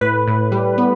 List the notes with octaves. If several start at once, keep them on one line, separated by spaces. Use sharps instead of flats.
A2 B4
A2
G3
B3